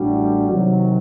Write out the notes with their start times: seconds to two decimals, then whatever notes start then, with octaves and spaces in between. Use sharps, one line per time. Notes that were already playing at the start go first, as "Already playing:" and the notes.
Already playing: A1 A2 G3 D4 F#4
0.50 C3 D#3 F#3